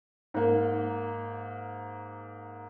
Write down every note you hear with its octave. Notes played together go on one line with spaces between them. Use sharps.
G#2 A#3